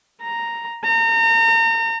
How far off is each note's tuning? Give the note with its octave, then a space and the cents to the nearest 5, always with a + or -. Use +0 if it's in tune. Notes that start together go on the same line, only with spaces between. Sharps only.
A#5 +0
A#5 -35